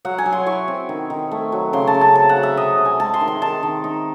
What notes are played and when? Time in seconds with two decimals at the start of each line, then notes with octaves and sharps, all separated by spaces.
0.05 F#3 F#5
0.18 G#5
0.26 F#3
0.33 C6
0.46 E4 C#6
0.68 C4
0.89 D#3
1.10 D#3
1.31 A3
1.52 F#3
1.73 C#3 C6
1.87 A5
1.95 C#3
2.01 A5
2.15 C4 A5
2.29 F#5
2.36 F#3
2.43 E5
2.57 C3 D#5
2.79 C3
2.85 G#5
3.00 G#3 A5
3.14 C6
3.21 D#3
3.28 C6
3.42 D#3 A5
3.63 D#3
3.84 D#4